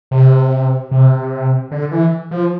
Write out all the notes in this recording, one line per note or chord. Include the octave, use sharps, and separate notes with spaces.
C3
C3
D3
E3
F3